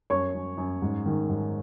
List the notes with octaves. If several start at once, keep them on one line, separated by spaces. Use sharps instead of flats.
F#2 C#5 C#6
F#2
F#2
G#2
D#3
G#2